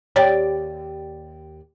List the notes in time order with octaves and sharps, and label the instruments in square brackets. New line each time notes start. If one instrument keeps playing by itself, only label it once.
[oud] D#2 G4 D5 [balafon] C#5